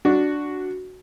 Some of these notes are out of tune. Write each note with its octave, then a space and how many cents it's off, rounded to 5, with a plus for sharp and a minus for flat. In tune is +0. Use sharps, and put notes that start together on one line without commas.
D4 +0 F#4 +0